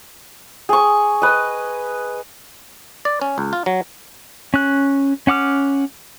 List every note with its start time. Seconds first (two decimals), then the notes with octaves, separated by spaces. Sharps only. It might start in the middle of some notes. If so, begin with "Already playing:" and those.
0.69 G#4 C#6
1.22 B4 D#5
3.05 D5
3.21 C#4
3.38 C#2
3.53 F4
3.66 F#3
4.54 C#4 F#6
5.27 C#4 F#5 D6 F6